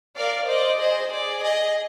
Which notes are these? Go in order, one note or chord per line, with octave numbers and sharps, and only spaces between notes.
A#4 D5 F5
C5 D5 D#5
G#4 C5 D#5
G#4 D5
D#5